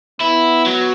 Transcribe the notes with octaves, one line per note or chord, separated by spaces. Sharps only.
B3 E4
F#3